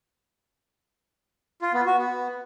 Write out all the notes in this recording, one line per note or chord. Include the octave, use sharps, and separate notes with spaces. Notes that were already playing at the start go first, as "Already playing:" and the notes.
F4
B3
F#4
B3